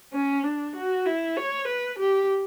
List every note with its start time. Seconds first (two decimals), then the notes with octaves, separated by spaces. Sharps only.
0.14 C#4
0.44 D4
0.75 F#4
1.06 E4
1.37 C#5
1.68 B4
1.99 G4